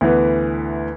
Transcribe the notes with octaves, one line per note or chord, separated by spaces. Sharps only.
D2 E3 B3